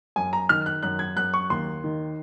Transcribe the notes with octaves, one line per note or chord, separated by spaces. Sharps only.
F#2 G#5
A#5
D#3 F6
F#6
F#2 F#6
G#6
F#2 F#6
C#6
D#2 C6
D#3